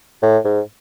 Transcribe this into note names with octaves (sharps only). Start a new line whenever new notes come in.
A2
G#2